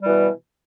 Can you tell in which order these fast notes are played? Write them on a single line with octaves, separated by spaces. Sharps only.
G3 E3 B2